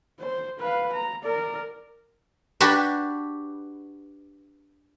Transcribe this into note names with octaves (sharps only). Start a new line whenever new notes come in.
C5
B4 F5
A#5
A#4 D5
D4 F#4 G4 B4